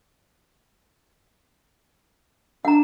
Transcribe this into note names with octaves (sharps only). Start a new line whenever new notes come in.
D4 F#5 A#5